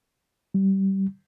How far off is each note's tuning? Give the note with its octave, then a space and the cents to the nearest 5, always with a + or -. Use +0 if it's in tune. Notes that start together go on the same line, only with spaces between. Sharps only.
G3 -20